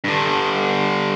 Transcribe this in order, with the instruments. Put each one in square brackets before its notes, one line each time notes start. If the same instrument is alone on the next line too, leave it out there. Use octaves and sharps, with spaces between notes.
[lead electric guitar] G2 D3